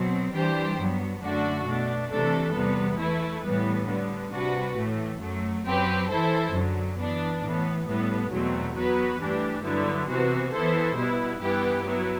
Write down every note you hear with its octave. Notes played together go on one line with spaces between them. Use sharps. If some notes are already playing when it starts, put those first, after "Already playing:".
Already playing: B2 F#3 C4
E3 G3 D4 G4 C5
G2 F#3 B3
F#2 D3 A3 D4 F#4
B2 A3 D4
C3 E3 A3 D4 A4
E2 C3 G3 B3
E3 A3 E4 B4
A2 E3 G3 B3
D3 G3 B3
C3 G3 D4 F#4 B4
A2 E3 A3
F#2 F#3 A3
F#2 F#3 C4 G4 B4
E3 A3 E4 A4 C5
F#2 D3 F#3
E3 B3 D4
A2 E3 B3
A2 G3 B3
E2 B2 F#3 A3 C4
F#3 B3 F#4 B4
G2 E3 A3 D4 G4
G2 D3 F#3 B3 E4
C3 E3 B3 F#4 C5
E3 B3 E4 A4 C5
B2 G3 B3 E4
G2 E3 B3 E4 G4
F#3 B3 E4